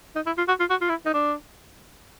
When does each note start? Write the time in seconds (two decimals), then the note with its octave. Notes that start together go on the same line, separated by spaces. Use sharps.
0.16 D#4
0.26 E4
0.38 F4
0.48 F#4
0.60 F4
0.70 F#4
0.81 F4
0.89 E4
1.06 D#4
1.14 D4